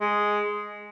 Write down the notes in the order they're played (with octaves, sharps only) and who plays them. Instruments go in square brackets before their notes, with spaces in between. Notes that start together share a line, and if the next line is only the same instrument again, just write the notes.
[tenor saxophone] G#3